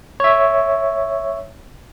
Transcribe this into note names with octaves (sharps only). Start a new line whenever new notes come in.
C#5 E5